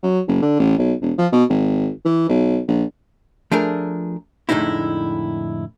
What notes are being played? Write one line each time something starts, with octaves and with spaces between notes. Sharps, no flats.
F#3
F#1
D3
A1
B1
E1
F3
B2
G#1
E3
B1
A#1
F3 A3 D4 G#4 A#4
F2 A2 D3 G#3 D#4 E4